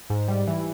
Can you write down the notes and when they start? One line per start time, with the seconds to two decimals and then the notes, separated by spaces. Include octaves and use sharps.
0.10 G#2
0.28 G3
0.47 E3